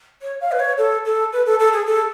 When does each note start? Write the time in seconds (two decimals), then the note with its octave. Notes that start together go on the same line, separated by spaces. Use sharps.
0.22 C#5
0.41 F5
0.52 B4
0.60 C#5
0.78 A4
1.05 A4
1.33 B4
1.46 A4
1.60 A4
1.73 G#4
1.87 A4